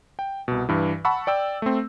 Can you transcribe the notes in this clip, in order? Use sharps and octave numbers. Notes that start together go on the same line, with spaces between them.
G5
C2 B2
G2 E3
F#5 A5 B5 C#6 E6
D5 G5 E6
A3 C4